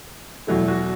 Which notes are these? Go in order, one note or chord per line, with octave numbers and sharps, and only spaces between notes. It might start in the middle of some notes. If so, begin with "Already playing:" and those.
E2 B2 F#3 A3 E4
F#4